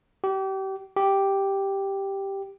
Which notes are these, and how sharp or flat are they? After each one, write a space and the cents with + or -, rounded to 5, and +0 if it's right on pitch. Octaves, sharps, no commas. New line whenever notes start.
G4 -30
G4 +0